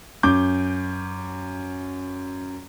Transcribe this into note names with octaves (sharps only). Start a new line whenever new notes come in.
F#2 D6 G6